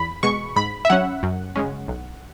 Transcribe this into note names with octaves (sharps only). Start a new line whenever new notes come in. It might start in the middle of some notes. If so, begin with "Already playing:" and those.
Already playing: E2 B5
B2 G#3 C#6
G#2 B5
E5
F#3 C#4 F#5
F#2
C#3 G#3 C#4
B1